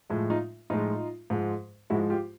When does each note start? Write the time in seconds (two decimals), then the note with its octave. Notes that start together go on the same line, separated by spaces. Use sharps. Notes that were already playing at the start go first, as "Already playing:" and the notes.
0.10 A2 F3 G#3
0.30 D#4 F4
0.70 A2 F3 G#3 D#4 F4
1.30 G#2 F3 G#3
1.90 G#2 F3 G#3 E4 F#4
2.10 F4 G4